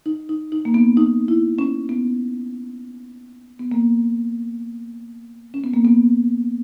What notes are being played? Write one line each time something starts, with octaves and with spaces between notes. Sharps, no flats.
D#4
D#4
D#4
A#3
B3
D#4
E4
C#4
B3
B3
A#3
C#4
B3
A#3
B3